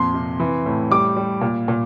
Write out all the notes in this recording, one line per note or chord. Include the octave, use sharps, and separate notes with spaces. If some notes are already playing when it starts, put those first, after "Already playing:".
Already playing: F2 A#2 C6
C3
E3
A2
G3 D6
G3
A#2
A#2